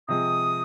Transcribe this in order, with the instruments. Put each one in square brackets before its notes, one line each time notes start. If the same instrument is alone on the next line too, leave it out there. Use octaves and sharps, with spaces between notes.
[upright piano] C3 F3 G#3 [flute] D#6